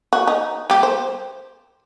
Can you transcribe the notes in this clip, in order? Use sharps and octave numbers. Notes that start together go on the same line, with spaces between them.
F#4
D#4
G3 G4
C5